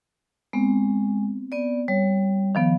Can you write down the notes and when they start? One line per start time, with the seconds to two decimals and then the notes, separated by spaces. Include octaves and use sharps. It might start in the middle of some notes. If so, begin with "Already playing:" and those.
0.53 G#3 B3 C4
1.52 B3 D5
1.88 G3 C#5
2.55 D#3 F3 B3